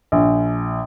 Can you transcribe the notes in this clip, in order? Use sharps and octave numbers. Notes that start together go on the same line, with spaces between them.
A#1